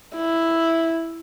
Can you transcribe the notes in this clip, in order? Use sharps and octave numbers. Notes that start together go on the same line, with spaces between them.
E4